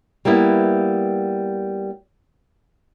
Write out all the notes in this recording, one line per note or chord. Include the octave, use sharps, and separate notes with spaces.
G3 A#3 B3 E4